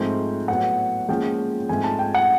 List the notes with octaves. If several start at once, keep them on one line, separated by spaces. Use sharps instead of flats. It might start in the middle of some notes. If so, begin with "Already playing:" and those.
Already playing: G#2 F3 A3 C4
A2 F#3 B3 F#5
A#2 F3 G#3 C#4 G5
G#2 F3 A3 C4 G#5
A5
G5
F#5